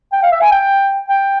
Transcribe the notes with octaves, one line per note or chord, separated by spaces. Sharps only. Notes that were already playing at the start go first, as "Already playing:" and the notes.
G5
F5
E5
G#5
G5
G5